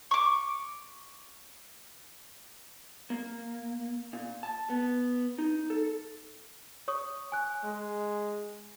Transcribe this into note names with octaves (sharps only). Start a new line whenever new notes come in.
C#6 D6
A#3
A#2
A5
B3
D#4
A4
C#5 C#6 D#6
G#5 F#6
G#3